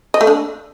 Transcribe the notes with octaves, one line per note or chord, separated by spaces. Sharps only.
D#5
A3
D4